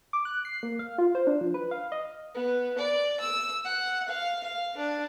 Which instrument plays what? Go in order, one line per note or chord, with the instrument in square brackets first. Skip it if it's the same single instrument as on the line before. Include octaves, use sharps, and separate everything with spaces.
[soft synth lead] D6
F#6
C7
A#3
F5
F4
C5
D4
F3
B4
F5
D#5
[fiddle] B3
D5
E6
F#5
F5
F5
D4